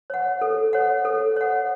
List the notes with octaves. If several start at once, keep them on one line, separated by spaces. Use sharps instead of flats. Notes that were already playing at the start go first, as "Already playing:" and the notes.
C#5 F#5
A4
C#5 F#5
A4
C#5 F#5